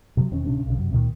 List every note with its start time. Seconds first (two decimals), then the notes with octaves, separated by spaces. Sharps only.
0.17 C3 F#3
0.31 E1 D#3 C4 C#4
0.46 D1 C3 C#4 D4
0.66 B1 C#3
0.78 F#2 C3
0.92 C#2 A#2 D#3